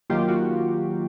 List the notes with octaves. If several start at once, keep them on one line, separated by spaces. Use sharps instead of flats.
D#3 F#3 A#3 F4 G4
F#4